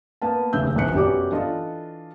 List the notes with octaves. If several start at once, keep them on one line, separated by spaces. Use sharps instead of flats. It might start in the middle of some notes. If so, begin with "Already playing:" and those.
A#3 B3 B4 F5 A5
F1 D#2 C#3 E5 E6 G6
A#1 D#2 C3 B3 F#6 C#7
F#2 B3 C#4 G4 D5 D6
E3 D4 F4 A4 D#5